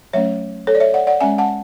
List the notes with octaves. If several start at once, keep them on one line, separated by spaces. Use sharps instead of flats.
F#3 A3 C#4 C#5 E5
A4 C#5
D5
C#5 E5
D5 F#5
D5 F#5
G#3 C#4 E5 G#5
F#5 A5